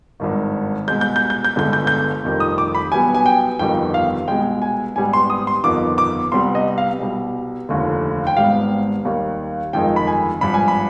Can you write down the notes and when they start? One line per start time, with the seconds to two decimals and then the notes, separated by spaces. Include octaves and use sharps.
0.20 G#1 G2 D#3
0.88 C2 B2 G#3 G6
1.01 G6
1.16 G6
1.30 G6
1.44 G6
1.56 G1 G2 D3 G#3 B3 G6
1.73 G6
1.87 G6
2.23 F1 F2 D#3 G3
2.40 D#6
2.58 D6
2.75 B5
2.91 B1 B2 G3 B3 G#5
3.15 G#5
3.26 G5
3.59 G1 F2 D#3 G3 B3 G5
3.94 F5
4.28 C2 B2 G#3 G5
4.62 G#5
4.96 G#1 G#2 G3 B3 G#5
5.13 C6
5.30 D#6
5.47 C6
5.64 G1 F2 D#3 B3 D6
5.98 D6
6.32 C2 C3 G3 B3 C6
6.55 D#5
6.78 F5
7.00 C2 B2 G3
7.69 F1 D#2 D3
8.27 G5
8.36 G#1 G#2 G3 B3 F5
9.05 D#2 D#3 G3
9.73 G1 F2 D#3 G#3 G5
9.96 B5
10.07 G#5
10.41 G#1 G2 F3 B5
10.54 G#5
10.68 B5